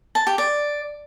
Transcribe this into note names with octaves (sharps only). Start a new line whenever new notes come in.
A5
G4
D5